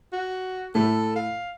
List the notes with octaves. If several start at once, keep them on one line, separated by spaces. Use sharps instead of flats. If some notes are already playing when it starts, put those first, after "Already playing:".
F#4
A2 A3 A4
F5